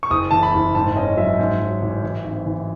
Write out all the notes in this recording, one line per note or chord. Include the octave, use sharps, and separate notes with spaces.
C#6
F#1 D#6
E3 A5
B5
F#1
G#2 A5
C#4 D#5
F#3 E5
G#2
F#3
A1
E3
G#1
E3